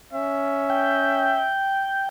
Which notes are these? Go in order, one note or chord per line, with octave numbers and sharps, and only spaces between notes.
C#4 E5
G5